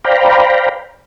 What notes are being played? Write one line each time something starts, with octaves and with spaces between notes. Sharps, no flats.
C5 D5 F5 G5 A#5 B5